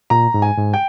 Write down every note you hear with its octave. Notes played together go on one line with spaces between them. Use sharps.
A#2 A#5
G#2
G#5
G#2
G5